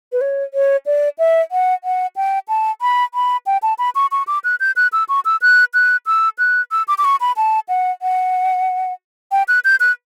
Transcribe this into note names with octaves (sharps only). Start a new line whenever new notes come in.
B4
C#5
C#5
D5
E5
F#5
F#5
G5
A5
B5
B5
G5
A5
B5
C#6
C#6
D6
F#6
G6
F#6
E6
C#6
E6
F#6
F#6
E6
F#6
E6
D6
D6
C#6
B5
A5
F#5
F#5
G5
F#6
G6
F#6